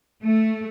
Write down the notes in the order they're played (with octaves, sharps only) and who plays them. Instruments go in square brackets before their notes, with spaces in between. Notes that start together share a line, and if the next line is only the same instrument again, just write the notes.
[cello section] A3